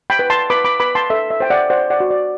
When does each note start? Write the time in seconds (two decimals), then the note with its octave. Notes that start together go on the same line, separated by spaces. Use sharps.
0.10 G5 B5
0.19 B4
0.30 A5 C6
0.50 B4 B5 D6
0.65 B5 D6
0.80 B4 B5 D6
0.95 A5 C6
1.10 A4 E5
1.30 E5
1.40 C5 G5
1.50 D5 F#5
1.70 C5 D5 F#5
1.90 D5 F#5
2.00 F#4
2.11 D5